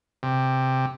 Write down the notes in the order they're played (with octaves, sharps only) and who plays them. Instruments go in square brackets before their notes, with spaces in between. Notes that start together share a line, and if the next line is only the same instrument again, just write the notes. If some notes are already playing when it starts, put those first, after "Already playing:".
[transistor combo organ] C3